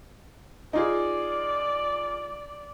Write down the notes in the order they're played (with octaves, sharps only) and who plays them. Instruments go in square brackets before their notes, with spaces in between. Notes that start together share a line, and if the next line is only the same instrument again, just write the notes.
[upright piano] D#4 F4 G#4 [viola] D5